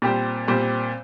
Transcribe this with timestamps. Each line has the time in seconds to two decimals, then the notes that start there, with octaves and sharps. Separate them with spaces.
0.02 A#2 G3 C4 G4 C5
0.48 A#2 G3 C4 G4 C5